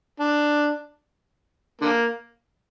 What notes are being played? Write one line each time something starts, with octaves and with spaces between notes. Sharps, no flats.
D4
D3 A#3